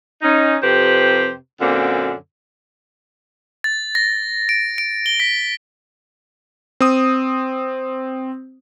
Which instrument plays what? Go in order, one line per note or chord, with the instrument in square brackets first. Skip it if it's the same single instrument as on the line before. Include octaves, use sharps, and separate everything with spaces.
[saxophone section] C#4 D#4
F2 C3 G4 B4 C5
F#2 A#2 D3 A#3 C4
[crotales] A6
A#6
D7
D7
G7
B6
[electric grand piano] C4 D#6